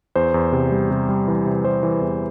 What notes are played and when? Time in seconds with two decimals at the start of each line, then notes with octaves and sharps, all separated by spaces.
0.16 E2 C5
0.34 E2
0.52 C3
0.71 G3
0.91 C3
1.09 G3
1.28 E3
1.46 C3
1.65 G3 C5
1.83 E3
2.02 E2